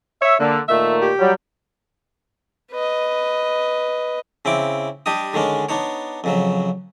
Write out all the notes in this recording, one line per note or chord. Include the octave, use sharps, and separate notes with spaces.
C#5 E5
D3 A#3
A#2 D#3 A3 E5
G4
F#3 G3
B4 D#5
C#3 C4 E4 D6
G3 D4 G4 D#5 D#6
D3 D#3 G#3 C#4 D4
B3 D4 D#4 C#5
F2 C#3 F#3